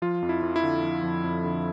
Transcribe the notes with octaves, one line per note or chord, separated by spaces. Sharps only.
F3 F4
F2
E4
F2
E4
D3
F3
F2
F2
D3